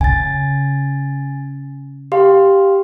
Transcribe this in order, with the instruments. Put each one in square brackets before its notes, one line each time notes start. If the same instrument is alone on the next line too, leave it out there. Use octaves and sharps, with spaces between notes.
[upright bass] C#3 [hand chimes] G#5 A6
[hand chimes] G4 F5 C6